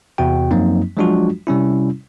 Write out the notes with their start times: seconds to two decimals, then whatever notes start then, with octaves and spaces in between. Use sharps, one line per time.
0.18 E2 C3 F#4 G5
0.51 F#2 F3 F#3 A#3 C4 D#4
0.97 F3 F#3 G#3 D4 F4 F#4
1.47 C3 G3 C#4 E4